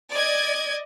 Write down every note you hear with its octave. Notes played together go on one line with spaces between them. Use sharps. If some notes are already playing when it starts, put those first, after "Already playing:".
D5 D#5 G#6